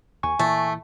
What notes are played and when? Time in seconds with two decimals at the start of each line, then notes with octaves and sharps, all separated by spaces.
0.23 D#2 G#5 C#6
0.39 A#2 E3 A3